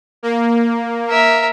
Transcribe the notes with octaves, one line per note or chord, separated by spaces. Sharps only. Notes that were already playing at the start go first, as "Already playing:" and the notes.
A#3
A#4 E5